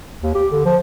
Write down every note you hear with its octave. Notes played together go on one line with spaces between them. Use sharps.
D#2
G4
D3
F3